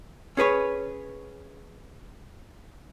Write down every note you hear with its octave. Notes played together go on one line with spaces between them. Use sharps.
C#4 G#4 B4 C#5